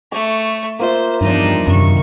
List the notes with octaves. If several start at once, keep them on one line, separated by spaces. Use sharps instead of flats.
A3 C#6 D6
A#3 F4 C5 E5
E2 G2 F3 G3 D4 D#4
G1 F#2 C3 D#3 C#6